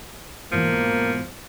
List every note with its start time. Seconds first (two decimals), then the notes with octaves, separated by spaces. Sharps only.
0.52 G#2 B2 E3 F3 A#3